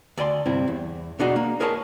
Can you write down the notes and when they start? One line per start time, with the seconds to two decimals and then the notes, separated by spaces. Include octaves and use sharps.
0.18 D2 D5 G#5 C6
0.46 G2 C3 C4 E4
0.68 E2
1.19 B2 D4 D#4 F#4 G#4
1.36 A#3
1.60 G#4 A#4 C#5 D#5 G5 A5